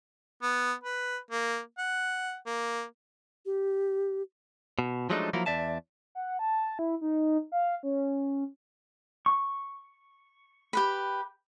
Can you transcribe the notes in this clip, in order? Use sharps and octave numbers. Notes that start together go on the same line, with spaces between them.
B3
B4
A#3
F#5
A#3
G4
B2
F3 F#3 G#3 A3 D4 D#4
F3 F#3 A#3 E4 A#4
E2 D5 E5 A5
F#5
A5
E4
D#4
F5
C#4
C#6
G4 B4 B5